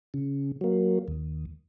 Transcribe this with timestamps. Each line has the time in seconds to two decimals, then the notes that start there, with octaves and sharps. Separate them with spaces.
0.14 C#3
0.61 F#3 A#3
1.08 D#2